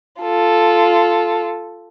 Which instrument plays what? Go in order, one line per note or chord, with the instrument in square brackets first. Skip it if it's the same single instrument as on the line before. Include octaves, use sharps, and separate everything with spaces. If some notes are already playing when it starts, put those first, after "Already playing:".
[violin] F4 A4